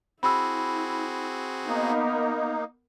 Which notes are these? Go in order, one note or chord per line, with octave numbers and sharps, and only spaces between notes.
C4 E4 F#4 G#4 B5 E6
A#3 B3 D#4 A#4